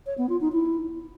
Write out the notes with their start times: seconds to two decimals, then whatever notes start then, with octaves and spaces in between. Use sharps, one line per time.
0.06 C#5
0.18 B3
0.29 F4
0.41 D#4
0.52 E4